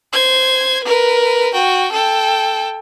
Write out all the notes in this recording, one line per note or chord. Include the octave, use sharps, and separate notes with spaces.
C5 G#6
A#4 B4
F#4 G5
A4 G5